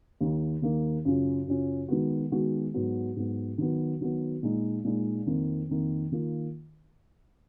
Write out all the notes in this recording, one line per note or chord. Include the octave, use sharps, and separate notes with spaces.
D#2 D#3 A#3 D#4
D#2 D#3 A#3 D#4
F#2 C#3 F#3 C#4 F4
F#2 C#3 F#3 C#4 F4
D#3 G#3 B3 F#4
D#3 G#3 B3 F#4
G#2 F#3 B3
G#2 F#3 B3
D#3 F#3 B3
D#3 F#3 B3
A#2 G#3 D#4
A#2 G#3 D#4
F2 D#3 A#3
F2 D#3 A#3
D#3 A#3 F4